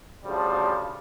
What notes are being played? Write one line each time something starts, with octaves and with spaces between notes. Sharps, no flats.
D2 C#3 F3 G3